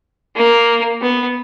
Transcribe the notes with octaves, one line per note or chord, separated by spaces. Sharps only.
A#3
B3